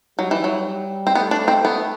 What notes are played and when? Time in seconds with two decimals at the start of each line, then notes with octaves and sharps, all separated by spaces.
0.18 F#3 G3
0.31 E3
0.44 F#3
1.07 C4
1.15 A3 B3
1.31 D4
1.48 C4
1.64 A3 B3